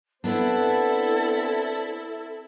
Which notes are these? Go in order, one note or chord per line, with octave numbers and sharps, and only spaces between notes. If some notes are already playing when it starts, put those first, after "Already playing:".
B3 C4 D4 E4 A4